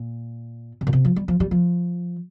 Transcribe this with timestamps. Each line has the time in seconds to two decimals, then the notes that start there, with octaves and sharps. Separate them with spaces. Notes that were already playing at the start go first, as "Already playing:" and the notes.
Already playing: A#2
0.81 C3
0.87 A#2
0.93 C3
1.05 F3
1.16 G3
1.28 F3
1.40 G3
1.51 F3